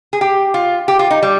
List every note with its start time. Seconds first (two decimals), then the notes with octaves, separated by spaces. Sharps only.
0.13 G#4
0.21 G4
0.54 F4
0.88 G4
0.99 F4
1.11 D#4
1.23 G3